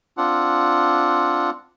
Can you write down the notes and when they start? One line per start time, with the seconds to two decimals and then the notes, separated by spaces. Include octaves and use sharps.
0.17 C4 D4 F4 F#5